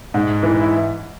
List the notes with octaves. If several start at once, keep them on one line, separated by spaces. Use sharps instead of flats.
G#2
E3
E4